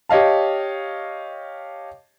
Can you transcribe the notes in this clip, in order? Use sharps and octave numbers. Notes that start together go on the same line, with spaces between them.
G4 C#5 D#5 F5 A5